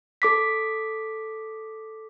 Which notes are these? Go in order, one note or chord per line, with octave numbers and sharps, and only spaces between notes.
A4 D6 B6